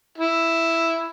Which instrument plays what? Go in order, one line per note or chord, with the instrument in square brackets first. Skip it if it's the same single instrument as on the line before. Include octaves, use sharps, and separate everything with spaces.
[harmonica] E4